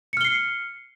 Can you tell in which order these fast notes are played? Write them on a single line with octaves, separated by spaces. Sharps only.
C#7 F6 G7 C7